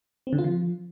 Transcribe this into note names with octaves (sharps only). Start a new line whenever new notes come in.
C4
D3
F4
F3